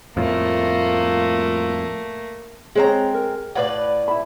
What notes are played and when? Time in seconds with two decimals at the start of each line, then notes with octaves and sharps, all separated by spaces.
0.17 F2 A2 A3 A#3 F4
2.75 G#3 C4 G#4 C5 C#5 A#5
3.14 A#4
3.55 A2 B4 D5 F5 F#5
4.08 E4 B5